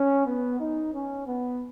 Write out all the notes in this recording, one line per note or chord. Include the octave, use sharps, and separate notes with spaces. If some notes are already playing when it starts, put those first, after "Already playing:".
Already playing: C#4
B3
D#4
C#4
B3